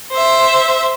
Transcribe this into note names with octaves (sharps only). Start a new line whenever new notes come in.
C5 E5